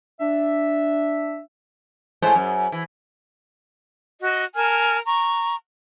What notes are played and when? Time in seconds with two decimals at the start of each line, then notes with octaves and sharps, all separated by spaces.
0.20 D4 E5
2.22 A2 G#3 C5
2.35 F#2
2.72 E3
4.20 F#4 D#5
4.55 A#4 G#5 A5 F6
5.05 A#5 C#6